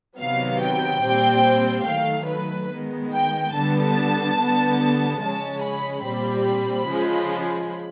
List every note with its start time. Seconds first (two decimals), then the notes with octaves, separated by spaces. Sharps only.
0.18 C3 D#3 F#3 B3 F5
0.60 G5
1.02 A#2 G3 C4
1.85 D#3 F#3 A3 F5
2.27 B4
2.69 D#3 G#3 B3
3.12 G5
3.53 D3 G3 B3 A5
4.37 D3 G3 B3
5.20 C#3 F3 G#3 C#4 A5
5.62 B5
6.04 A#2 G3 C4 B5
6.88 C#3 F3 G#3